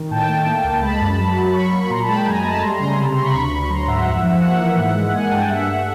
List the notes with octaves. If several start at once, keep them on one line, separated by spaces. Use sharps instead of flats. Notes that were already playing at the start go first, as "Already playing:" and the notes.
Already playing: D#3
A2 G5 A5
A3
A#3
C#2
G#3 A5 B5
F#2
F#3
F#3
F#3 B5 C#6
A#3
A#2 A#5 C6
A5 B5
G#3
G5 A5
F#2 G#5 A#5
A3 A5 B5
G3 A#5 C6
A#5 C6
C#3
G#5 A#5
C3 A5 B5
A#5 C6
C3
B5 C#6
D2
D2
F#3 A#5 C6
G#2 E5 F#5
F2
F3
A#3 E5 F#5
E3
G#2
G#3
A#3 F#5 G#5
G2 G5 A5
G2 E5 F#5
A3